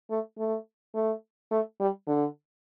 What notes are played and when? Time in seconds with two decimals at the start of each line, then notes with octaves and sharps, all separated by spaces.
0.10 A3
0.38 A3
0.95 A3
1.51 A3
1.80 G3
2.08 D3